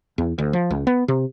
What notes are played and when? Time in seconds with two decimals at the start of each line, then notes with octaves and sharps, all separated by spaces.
0.18 E2
0.38 D2
0.53 F3
0.71 C#2
0.87 B3
1.08 C3